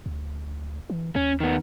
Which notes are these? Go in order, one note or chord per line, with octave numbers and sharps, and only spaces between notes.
D2
E3
D#2 C#4
D#3 B3